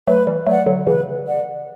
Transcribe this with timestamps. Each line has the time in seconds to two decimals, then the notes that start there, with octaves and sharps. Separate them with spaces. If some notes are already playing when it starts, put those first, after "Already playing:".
0.07 F#3 A3 B4
0.27 E3 G3
0.47 F#3 A3 D5 F#5
0.66 D3 F#3
0.87 C#3 E3 B4
1.26 D5 F#5